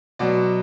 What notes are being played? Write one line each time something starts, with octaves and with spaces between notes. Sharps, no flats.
B2 F#3 D5